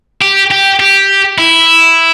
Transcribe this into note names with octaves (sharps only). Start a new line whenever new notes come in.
G4
G4
G4
E4